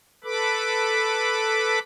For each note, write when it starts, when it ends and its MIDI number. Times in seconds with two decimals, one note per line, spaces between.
0.24 1.79 69
0.24 1.79 71
0.24 1.79 83
0.24 1.79 86